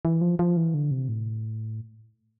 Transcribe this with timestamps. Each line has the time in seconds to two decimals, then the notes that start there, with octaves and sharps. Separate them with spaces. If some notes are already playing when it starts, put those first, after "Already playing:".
0.05 E3
0.21 F3
0.39 F3
0.57 E3
0.74 D3
0.91 C3
1.09 A2